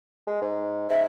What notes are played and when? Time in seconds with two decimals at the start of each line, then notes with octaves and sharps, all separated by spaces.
0.27 G#3
0.41 G#2
0.90 G#2 E5